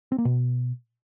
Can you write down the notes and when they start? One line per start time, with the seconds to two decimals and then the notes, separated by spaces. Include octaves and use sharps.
0.12 C4
0.18 A#3
0.25 B2